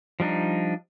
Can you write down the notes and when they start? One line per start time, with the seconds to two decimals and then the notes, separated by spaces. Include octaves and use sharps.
0.20 F3 G3 D4 D#4